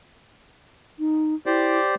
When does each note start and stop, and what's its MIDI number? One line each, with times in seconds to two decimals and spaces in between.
0.99 1.35 63
1.46 1.78 64
1.46 1.95 67
1.46 1.95 72
1.46 1.95 74